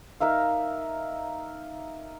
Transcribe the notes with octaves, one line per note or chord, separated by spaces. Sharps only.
D#4 A#4 E5 F5